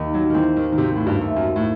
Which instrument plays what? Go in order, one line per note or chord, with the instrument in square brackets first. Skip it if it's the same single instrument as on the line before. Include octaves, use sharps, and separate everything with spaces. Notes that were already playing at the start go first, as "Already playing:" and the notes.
Already playing: [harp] D#2
[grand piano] F#3
D#3
[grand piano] E3 [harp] C4
[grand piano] D#3
D#3
[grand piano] C3 [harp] C4
[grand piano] A2
G2
[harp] A3
[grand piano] F#2
A2